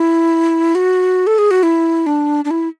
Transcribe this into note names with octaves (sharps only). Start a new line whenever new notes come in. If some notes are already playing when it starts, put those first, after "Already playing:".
Already playing: E4
F#4
A4
G#4
F#4
E4
D4
D4
E4